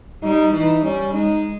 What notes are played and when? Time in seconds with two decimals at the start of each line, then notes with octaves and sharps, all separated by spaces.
0.23 G3 D#4
0.53 E3 D#4
0.83 G3 C#4
1.13 G#3 D#4